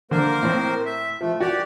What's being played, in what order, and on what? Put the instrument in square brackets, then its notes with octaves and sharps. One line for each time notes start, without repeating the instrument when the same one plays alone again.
[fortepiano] D3 [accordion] A#3 A#4 C5
[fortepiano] A2 C4
[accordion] E5
[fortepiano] F3 [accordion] A3
[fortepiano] F#4 [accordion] G4 D5